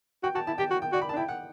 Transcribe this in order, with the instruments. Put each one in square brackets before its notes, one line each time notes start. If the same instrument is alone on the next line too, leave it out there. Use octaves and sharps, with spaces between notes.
[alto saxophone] F#4 [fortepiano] G5
[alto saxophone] F#4 [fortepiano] A5
[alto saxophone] E4 [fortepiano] A5
[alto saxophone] G4 [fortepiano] G5
[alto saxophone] F#4
[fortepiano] G5
[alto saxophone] F#4 [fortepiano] D5
[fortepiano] B5
A5
[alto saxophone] D4
[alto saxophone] E4 [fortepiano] G5
[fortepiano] F#5